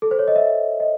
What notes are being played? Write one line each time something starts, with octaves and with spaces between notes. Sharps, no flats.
A4
C5
C#5
D#5
E5
D#5